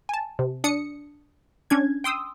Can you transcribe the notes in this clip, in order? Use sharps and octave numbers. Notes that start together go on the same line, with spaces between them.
G#5 A5
C3
D4 D#6 C#7
C#4 D4 G#6
G5 C6 D#6 E6